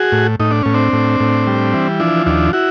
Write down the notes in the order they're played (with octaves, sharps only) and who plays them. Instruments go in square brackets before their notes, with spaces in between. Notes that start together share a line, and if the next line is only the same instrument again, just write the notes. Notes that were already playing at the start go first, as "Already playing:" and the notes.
Already playing: [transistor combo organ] F#4 G#4
A2
A2 D#4
D4
A2 C#4
C4 D4
A2
A2
G3
E3
F3 D4 E4
D#2 D4 E4
E4 F#4